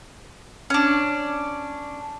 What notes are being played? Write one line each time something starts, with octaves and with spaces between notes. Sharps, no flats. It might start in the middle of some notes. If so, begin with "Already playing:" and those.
C#4 D4